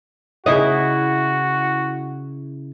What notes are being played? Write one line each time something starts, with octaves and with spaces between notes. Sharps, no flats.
C#3 E4 F#4 D#5